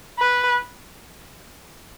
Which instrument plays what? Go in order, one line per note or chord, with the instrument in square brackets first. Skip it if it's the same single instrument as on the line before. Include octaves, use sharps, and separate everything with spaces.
[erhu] B4